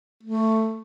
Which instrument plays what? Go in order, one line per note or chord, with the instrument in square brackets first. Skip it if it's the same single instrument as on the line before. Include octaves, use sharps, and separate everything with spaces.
[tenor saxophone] A3